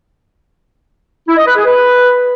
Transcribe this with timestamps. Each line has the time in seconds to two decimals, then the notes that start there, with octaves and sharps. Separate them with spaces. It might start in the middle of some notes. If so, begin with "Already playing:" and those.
1.28 E4
1.37 D#5
1.47 B4
1.56 G#4
1.66 B4